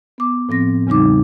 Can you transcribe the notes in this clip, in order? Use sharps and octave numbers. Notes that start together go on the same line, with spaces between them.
B3 D6
A2 F3 C4 A#6
E2 C#3 G3 D#4 D6